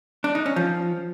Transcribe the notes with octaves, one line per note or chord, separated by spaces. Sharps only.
D4
D#4
C#4
F3